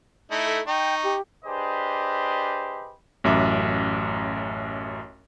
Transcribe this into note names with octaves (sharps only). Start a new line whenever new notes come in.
A3 D#4 E4
A4
D#4 G5 C#6
G4
D4 G4 G#4 B4 C5 D#5
A1 F#2 E5 D6